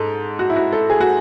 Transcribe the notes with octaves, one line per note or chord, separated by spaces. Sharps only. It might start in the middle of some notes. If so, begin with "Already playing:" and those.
Already playing: G#2 A4
F#4
E4
F#4
A4
G#4
F#4